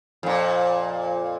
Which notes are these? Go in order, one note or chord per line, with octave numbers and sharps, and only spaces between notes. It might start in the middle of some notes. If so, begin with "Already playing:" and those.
F2 A#2